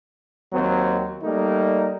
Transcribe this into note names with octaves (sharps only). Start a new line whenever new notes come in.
D#2 F#3 C4
G3 A3 A#3 D#4